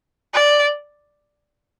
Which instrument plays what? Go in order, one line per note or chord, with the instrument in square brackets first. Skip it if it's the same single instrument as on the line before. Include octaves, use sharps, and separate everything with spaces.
[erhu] D5